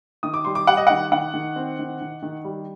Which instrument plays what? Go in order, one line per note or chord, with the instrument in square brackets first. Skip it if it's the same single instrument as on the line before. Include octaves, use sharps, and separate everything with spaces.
[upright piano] D#3 D#6
D6
G3 C6
D6
G3 F#5
D#5
D#3 F#5
D#3 F#5
D#3
C4
D#3
D#3
D#3
G3